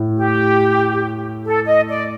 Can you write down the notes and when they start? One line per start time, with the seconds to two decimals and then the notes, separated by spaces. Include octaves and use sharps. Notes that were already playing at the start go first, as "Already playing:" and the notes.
Already playing: A2
0.17 G4
1.45 A4
1.66 D#5
1.88 D5